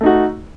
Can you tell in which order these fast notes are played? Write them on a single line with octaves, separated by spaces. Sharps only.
A3 D#4 F#4